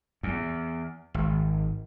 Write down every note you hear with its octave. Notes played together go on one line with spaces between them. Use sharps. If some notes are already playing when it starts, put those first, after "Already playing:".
E2
G#1